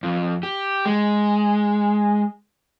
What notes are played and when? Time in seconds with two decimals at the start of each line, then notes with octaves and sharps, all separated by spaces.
0.03 F2
0.43 G4
0.85 G#3